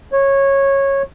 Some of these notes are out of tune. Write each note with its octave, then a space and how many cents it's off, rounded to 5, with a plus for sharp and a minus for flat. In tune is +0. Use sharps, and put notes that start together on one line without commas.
C#5 -15